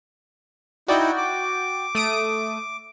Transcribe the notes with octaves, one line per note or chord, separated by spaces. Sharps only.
D#4 E4 F#4 D5 G5
D6
A3 D#6 D7